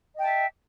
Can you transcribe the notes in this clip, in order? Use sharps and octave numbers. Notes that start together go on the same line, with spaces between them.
D#5 E5 G5 A5